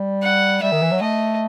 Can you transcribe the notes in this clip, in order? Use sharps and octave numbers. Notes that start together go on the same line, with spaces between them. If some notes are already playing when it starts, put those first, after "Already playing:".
Already playing: G3
F#5
G3 E5
D#3
E3
F#3
A3 D#5